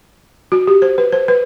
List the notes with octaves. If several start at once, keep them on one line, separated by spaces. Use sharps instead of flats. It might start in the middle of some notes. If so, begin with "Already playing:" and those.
F#4
G4
C5
B4
C5
B4